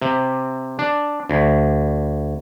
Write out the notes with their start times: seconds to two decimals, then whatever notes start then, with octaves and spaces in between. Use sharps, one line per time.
0.02 C3
0.79 D4
1.30 D2